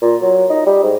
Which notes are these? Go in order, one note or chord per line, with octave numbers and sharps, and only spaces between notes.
A#2
F#3
D#4
G3
G#2